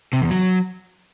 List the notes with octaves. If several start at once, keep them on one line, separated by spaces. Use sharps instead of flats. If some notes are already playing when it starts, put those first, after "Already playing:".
C3
E2
F#3